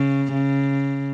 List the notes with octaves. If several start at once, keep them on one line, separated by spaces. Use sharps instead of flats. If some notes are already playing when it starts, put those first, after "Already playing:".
Already playing: C#3
C#3